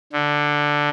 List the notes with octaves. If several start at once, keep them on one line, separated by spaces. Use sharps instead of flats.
D3